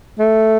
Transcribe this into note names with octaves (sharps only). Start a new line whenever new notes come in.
A3